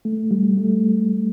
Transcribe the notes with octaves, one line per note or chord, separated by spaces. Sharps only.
A3
G3
A3